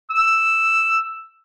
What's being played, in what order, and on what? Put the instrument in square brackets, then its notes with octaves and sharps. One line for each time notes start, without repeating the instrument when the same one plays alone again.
[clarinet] E6